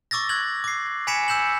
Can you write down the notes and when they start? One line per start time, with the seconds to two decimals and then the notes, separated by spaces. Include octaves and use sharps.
0.11 C#6 D6 E6 A6 A#6
0.29 F#6 G#6 F#7
0.64 D6 C7
1.07 G#5 B5 G#6 B6 C#7 E7
1.28 E6 G6 E7 F#7